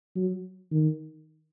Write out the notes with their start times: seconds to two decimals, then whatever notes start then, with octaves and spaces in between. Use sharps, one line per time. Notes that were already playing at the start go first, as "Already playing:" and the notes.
0.16 F#3
0.71 D#3